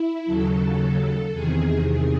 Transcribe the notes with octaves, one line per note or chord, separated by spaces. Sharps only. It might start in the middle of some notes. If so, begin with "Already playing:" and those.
Already playing: E4
D#2 C#3 F#3 A4
E2 C3 D#3 G#4
G#4